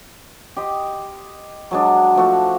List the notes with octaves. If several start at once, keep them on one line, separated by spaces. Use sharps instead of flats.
G4 D#5 C6
F#3 G#3 D4
F3 A3 F#4